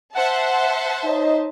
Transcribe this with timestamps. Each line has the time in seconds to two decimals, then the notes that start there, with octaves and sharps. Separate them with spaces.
0.15 C5 E5 F#5 A5
1.04 D#4 C#5 D#5